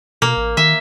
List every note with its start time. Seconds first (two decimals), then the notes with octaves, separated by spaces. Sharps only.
0.22 B2 A#3
0.37 A1
0.57 D#3 E5